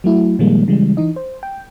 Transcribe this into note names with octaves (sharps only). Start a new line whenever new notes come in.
F#3 A3 E4 F#4
A#2 D#3 F3 G3 G#3 A#3
C#3 E3 G3 G#3
E3 D#4 D#5
C5
G5